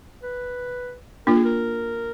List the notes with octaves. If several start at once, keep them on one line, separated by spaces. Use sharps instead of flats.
B4
A#3 D4 F4 A#4
G#4
A#4